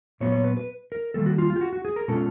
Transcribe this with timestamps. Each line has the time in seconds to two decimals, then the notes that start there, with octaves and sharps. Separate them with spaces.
0.20 A#2 F#3 B3 C#5
0.32 C#5
0.44 B4
0.57 B4
0.92 A#4
1.14 D#3 G3 A#3 A4
1.26 F#4
1.38 F4
1.50 F4
1.56 G4
1.61 F#4
1.73 F#4
1.85 G#4
1.96 A#4
2.08 B2 G#3 C#4 F4 A4